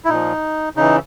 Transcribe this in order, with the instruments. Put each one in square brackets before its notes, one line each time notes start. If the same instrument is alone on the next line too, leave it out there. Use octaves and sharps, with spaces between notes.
[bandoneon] E4
A#2 F3 D#4
C#3 E3 D#4